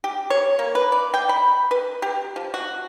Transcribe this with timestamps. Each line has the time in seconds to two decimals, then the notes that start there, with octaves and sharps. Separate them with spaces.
0.04 G4
0.30 C#5
0.59 A#3
0.75 B4
0.92 D5
1.14 G5
1.29 B5
1.71 B4
2.02 G4
2.36 F3
2.54 F#4